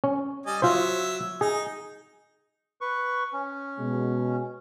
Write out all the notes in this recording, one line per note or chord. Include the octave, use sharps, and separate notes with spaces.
C#4
G3 D#5 G#5
F#3 F4 C5 E5
D#4 G#4
B4 C#6
C#4
B2 G#3